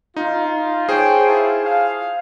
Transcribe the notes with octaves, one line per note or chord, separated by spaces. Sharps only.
D#4 F4
G#4 C5 C#5 G5
E4 F4 A5
F5